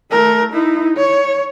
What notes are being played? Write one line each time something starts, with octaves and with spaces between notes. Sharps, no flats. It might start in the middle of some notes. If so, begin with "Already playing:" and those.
A3 A#4
D#4 E4
C#5